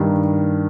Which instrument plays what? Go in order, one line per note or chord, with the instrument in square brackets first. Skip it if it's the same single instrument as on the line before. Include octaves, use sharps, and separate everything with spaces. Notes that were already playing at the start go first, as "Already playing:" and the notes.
Already playing: [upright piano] G2 D#3